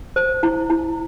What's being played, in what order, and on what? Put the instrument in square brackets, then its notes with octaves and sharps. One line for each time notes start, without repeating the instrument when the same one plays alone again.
[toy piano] C5
E4
E4